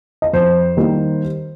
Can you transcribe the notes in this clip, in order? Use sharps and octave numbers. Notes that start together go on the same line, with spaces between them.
D#5
F2 C5
D#3 G3 A#3